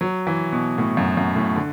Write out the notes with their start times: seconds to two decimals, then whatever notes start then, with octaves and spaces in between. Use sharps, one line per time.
0.01 F#3
0.27 E3
0.52 B2
0.78 A2
0.97 F#2
1.17 F#2
1.36 A2
1.56 D3